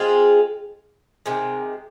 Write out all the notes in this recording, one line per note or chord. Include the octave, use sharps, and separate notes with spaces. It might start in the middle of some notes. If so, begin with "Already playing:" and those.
Already playing: G#3 C4 F4 G#4
C3 D#3 G#3